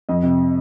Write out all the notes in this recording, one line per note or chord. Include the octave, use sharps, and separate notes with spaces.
F2 D#5
C3